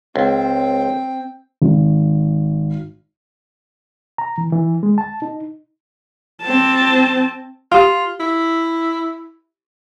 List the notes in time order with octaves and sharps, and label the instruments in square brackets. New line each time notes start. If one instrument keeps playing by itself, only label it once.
[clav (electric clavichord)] C#2 [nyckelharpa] C4 G5
[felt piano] G#1
[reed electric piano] A#5
E3
E3
G#3
A5
D#4
[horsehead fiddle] C4 A5
[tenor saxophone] F4 [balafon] G4 F5
[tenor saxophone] E4